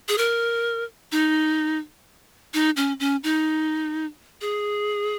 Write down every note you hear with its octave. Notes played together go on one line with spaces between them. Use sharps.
G#4
A#4
D#4
D#4
C#4
C#4
D#4
G#4